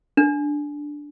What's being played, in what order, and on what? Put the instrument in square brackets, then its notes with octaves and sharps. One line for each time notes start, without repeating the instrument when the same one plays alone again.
[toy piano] D4